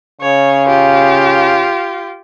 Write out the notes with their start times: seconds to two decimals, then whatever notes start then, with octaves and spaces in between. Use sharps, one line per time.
0.21 C#3 C#5
0.67 F4 G4